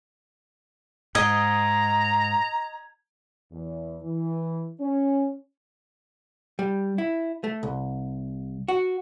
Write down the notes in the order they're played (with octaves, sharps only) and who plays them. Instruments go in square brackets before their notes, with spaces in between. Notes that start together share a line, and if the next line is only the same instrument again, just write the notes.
[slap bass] G#2 [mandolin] D#5 [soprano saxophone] A#5 [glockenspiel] G#6
[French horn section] E2
E3
C#4
[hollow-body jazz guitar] G3
E4
A3
C2
F#4